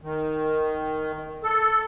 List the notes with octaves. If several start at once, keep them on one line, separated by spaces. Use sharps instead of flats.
D#3
A4